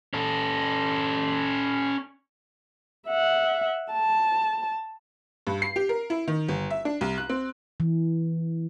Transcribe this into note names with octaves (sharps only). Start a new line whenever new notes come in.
C#4 A4
E5 F#5
A5
G2
C7
G4
A#4
E4
D#3
G1
E5
D4
C2
F#6
C4
E3